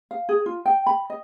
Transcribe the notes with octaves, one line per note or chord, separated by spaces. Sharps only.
F5
G#4
F4
G5
B5
D#5